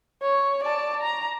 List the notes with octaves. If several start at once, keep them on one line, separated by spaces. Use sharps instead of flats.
C#5
D5 A5
A#5